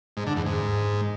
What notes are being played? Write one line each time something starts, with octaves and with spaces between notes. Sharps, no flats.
G#2
D3
E2
G#2